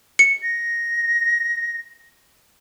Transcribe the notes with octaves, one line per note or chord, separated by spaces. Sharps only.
C#7
A#6